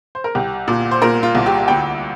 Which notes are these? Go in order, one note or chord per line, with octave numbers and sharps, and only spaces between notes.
C5
A#4
C2 G4
A#2
C5
A#2 A#4
F4
C2
G4
D2 G5